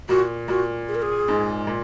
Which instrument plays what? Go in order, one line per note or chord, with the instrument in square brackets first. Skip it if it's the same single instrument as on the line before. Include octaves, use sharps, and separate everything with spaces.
[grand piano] A#2 [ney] F#4
[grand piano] A#2 [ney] F#4
[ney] G#4
A#4
G#4
[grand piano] G#2
A#2